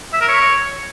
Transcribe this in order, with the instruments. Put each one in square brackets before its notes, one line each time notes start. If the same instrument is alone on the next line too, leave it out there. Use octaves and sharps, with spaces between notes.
[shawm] E5
A#4
C#5